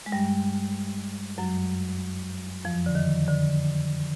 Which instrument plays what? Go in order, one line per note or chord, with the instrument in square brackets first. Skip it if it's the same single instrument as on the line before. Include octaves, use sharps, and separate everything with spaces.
[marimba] G#3
G2 G3
F#2 F#3
F2 F3
D3
D#3
D3